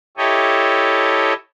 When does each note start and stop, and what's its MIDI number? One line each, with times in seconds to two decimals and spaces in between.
0.18 1.33 64
0.18 1.33 67
0.18 1.33 69
0.18 1.33 73
0.18 1.33 75